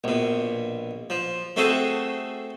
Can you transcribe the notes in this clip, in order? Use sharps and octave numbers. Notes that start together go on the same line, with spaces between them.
A#1 B2
F3
A3 C4 F#4 G#4 A4